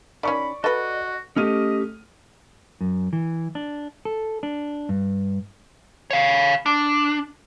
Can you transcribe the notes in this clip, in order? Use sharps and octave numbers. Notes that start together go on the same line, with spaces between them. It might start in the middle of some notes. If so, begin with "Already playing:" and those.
D#3 C#4 D5 B5 C#6
F#4 A4 B4 D#5
A3 C#4 G4 D#5 F6 D#7
F#2
E3
D4
A4
D4
G2
C#5 F5
D4